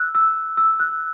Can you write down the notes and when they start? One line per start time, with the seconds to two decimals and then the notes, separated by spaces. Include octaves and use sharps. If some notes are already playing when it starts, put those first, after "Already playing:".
Already playing: E6 F#6
0.15 E6
0.57 E6
0.80 F#6